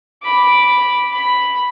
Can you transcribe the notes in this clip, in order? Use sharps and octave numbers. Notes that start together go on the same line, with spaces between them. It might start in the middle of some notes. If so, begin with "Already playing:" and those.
B5 D6
B5